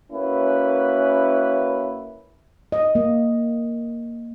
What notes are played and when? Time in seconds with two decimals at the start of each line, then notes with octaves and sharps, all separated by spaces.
0.12 A#3 C#4 E4 F#4 B4
2.72 D#5
2.95 A#3